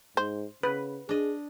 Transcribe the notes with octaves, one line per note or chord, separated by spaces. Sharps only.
G#2 C5
C#3 B4
D4 G#4 D#5